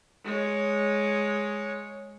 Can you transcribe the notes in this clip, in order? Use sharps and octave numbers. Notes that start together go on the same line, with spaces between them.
G#3 C#5